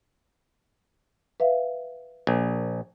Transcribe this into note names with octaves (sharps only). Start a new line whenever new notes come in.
B4 E5 F5
A#1